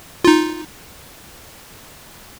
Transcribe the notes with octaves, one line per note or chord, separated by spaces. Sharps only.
D#4 F4